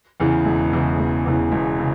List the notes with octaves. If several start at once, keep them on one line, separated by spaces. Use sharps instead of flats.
E2 C#3 E3
E1
E2 C#3 E3
E1
E2 C#3 E3
E1
C#3